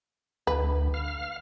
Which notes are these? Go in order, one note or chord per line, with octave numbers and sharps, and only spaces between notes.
D2 B4
F5 F6